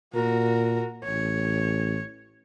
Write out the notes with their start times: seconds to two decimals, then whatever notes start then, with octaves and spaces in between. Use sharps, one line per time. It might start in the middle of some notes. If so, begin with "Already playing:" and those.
0.14 A#2 F#4 A#4
1.05 A1 C#5